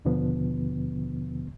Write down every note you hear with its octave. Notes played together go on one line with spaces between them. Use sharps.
D#2 B2 D3 F3 B3